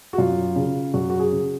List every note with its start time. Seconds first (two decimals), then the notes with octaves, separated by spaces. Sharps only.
0.13 F#4
0.18 F#2 F4
0.56 C#3
0.94 F#2 F#4
1.10 F#4
1.19 G#4
1.32 C#3